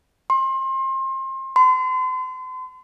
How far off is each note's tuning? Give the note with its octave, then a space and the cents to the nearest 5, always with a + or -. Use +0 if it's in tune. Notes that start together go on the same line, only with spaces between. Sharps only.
C6 +30
C6 -40